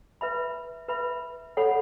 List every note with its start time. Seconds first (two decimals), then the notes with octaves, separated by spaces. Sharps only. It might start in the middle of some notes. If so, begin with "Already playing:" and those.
0.21 B4 E5 B5
0.89 B4 E5 B5
1.57 A4 C#5 F#5 B5